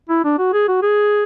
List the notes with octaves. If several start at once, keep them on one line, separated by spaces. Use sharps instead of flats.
E4
D4
F#4
G#4
F#4
G#4